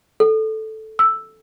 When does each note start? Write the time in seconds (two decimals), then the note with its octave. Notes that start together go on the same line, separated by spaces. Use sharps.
0.20 A4
0.99 E6